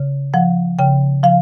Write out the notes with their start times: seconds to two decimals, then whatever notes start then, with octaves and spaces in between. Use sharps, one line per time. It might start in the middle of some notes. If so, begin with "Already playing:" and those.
Already playing: C#3
0.34 F3 F#5
0.79 C#3 G5
1.23 F3 F5